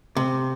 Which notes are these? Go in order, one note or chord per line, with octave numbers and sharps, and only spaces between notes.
C3